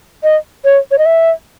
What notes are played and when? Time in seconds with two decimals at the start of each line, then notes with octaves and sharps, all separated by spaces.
0.23 D#5
0.65 C#5
0.91 C#5
0.98 D#5
1.06 E5